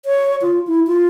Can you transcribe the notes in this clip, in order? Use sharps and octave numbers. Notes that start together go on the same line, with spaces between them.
C#5
F4
E4
F4